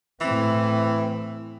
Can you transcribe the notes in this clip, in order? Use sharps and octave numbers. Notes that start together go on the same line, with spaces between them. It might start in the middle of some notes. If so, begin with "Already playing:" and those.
A2 E3 C4